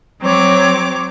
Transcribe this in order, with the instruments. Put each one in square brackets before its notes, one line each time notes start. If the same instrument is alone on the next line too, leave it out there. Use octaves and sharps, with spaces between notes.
[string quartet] F#3 C4 C#5 D6